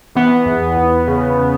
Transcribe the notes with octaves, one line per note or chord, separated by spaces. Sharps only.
E3 B3
E2
E2
C#3
C#3